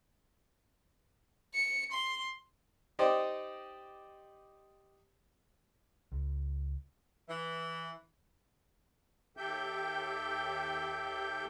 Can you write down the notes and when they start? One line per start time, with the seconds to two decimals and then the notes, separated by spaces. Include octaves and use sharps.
1.54 C#7
1.92 C6
2.99 D#4 G4 C5 D5 D#5
6.12 C#2
7.28 E3
9.37 D#2 G4 A4 E5 G5 G6